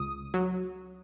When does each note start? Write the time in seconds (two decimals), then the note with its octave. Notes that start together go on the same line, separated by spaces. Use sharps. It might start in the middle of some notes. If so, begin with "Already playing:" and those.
Already playing: C#2 D#6
0.34 F#3